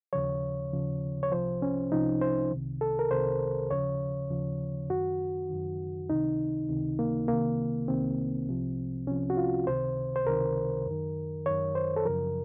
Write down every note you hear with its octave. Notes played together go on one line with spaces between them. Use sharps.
D#2 C#3 F3 C#5
D#2 C#3 F3
C#5
C2 C3 F3 C5
C#4
C2 C3 F3 D#4
C5
C2 C3 D#3
A4
A#4
C2 C3 D#3 C5
D#2 C#3 F3 C#5
D#2 C#3 F3
F#2 D#3 F#4
F#2 D#3
C#2 C3 D#3 D#4
C#2 C3 D#3
A#3
C2 C3 D#3 A#3
C2 C3 D#3 C4
C2 C3 F3
C2 C3 F3 C#4
F#4
F4
C#2 C3 D#3 C5
C5
C#2 C3 D#3 A#4
F#2 D#3
F#2 D#3 C#5
C5
A4
F#2 C#3 F3 A#4